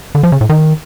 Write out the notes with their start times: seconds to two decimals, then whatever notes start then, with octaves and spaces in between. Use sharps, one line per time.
0.15 D3
0.23 F3
0.32 C#3
0.41 A2
0.49 D#3